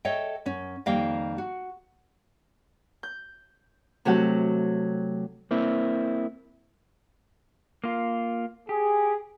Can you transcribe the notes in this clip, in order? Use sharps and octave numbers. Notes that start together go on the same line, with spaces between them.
A4 C#5 D#5 E5 G5
F#2 C#4
F2 D#3 G3 A#3 F5 G5
F#4
G6
C3 F#3 A3 F#4 G4 F#5
A#3 C4 E4
A#3 F4
G4 G#4